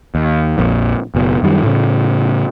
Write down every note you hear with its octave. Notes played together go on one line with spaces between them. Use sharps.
D#2
A#1 F2
F#1 B2
F#2 D#3 G3
A2 C#3